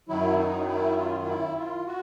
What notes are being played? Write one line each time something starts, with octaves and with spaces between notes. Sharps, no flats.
F#2 D#3 F#3 E4
D#4
E4
F4
F4
E4
F4
F#4